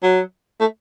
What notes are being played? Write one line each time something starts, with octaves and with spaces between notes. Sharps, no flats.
F#3
A3